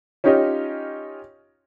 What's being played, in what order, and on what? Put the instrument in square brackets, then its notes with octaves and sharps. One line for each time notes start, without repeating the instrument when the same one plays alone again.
[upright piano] C#4 D#4 F4 G4 C#5 D#5